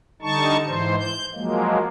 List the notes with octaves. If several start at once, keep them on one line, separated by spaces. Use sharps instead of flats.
D3 G3 D#4 A5 C#6
G#2 E3 C5
G6
F3 F#3 G#3 A#3